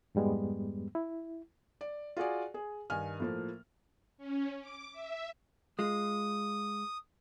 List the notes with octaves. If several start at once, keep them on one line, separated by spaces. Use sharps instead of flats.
F2 G#2 G3 G#3 B3
E4
D5
F4 F#4 G#4 D5
G#4
G2 D#3 G#5 F6
A2 F3 A#3
C#4
D6
E5
G#3 F4 D#6